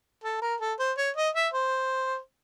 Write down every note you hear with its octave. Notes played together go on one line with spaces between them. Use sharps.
A4
A#4
A4
C5
C#5
D#5
E5
C5